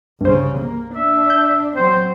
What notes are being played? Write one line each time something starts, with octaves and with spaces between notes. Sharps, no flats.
C2 G2 C#3 C5
A#3
D4 E5
G6
F#3 C4 C5